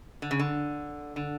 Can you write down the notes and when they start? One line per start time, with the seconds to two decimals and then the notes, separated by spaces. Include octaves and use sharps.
0.22 D3
0.31 C#3
0.39 D3
1.16 D3